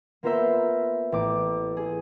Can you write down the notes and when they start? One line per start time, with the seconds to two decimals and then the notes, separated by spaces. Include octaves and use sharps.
0.23 A#3 B3 F4 A#4 C5 E5
1.12 A1 D6
1.77 G#4